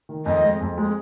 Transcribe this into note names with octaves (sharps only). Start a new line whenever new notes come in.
D#3
F2 D#5
G#3
F2
G#3